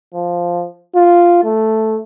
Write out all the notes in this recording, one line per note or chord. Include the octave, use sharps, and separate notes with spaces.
F3
F4
A3